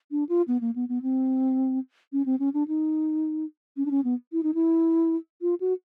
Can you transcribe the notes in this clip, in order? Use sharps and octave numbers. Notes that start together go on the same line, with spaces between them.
D4
F4
B3
A#3
B3
B3
C4
C#4
C4
C#4
D4
D#4
C#4
D4
C#4
B3
E4
D#4
E4
F4
F#4